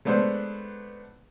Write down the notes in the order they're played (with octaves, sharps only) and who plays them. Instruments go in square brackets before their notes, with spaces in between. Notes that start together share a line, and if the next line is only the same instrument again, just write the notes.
[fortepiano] G#3 A3 B3 D4 C5